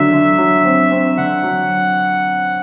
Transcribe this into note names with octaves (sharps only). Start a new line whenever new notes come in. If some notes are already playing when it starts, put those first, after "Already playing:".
Already playing: D3 F#3 E5
D3
F#3
C4
C4
D3 F#5
F#3